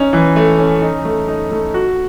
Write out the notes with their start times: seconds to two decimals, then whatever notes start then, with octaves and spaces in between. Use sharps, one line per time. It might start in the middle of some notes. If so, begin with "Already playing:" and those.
Already playing: C#4 D#4
0.13 E3
0.36 A3
0.59 C#4
0.81 D#4
1.05 A3
1.28 D#4
1.51 A3
1.74 F#4